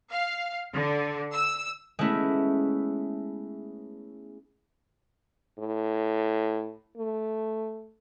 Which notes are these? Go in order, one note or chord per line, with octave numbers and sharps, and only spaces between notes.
F5
D3
E6
G#3 A3 B3 C#4 E4
A2
A3